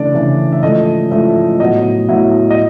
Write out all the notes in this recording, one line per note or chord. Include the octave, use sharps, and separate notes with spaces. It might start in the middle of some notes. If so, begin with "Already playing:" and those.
Already playing: C#3 E3 A3 D4 D5
C#3 E3 A3 D4
E5
G#2 F3 A3 C#4 E4 D#5
G#2 F3 A3 C#4 E4 E5
A2 F#3 B3 E4 D#5
A2 F#3 B3 E4
D#5